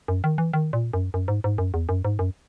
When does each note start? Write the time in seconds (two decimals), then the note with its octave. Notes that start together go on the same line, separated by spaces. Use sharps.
0.08 F#2
0.24 D#3
0.38 E3
0.53 D#3
0.73 A#2
0.93 F#2
1.14 F#2
1.28 G#2
1.44 G#2
1.58 F#2
1.74 E2
1.89 F#2
2.05 G#2
2.19 F#2